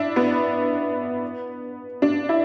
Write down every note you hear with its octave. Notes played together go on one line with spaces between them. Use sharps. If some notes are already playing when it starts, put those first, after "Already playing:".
Already playing: D4 E4
B3
D4
E4